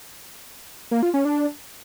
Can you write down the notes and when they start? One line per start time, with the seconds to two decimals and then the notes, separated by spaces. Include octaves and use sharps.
0.91 A#3
1.03 F4
1.14 C#4
1.25 D4